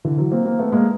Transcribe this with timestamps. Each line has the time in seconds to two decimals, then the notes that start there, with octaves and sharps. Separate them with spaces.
0.05 D3 E3
0.18 E3 F#3
0.32 A#3 C4
0.45 A#3 C4
0.59 A3 B3
0.72 G#3 A#3